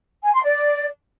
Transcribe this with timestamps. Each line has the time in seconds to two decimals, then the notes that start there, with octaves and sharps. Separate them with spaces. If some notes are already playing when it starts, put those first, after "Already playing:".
0.24 G#5
0.33 C6
0.43 D5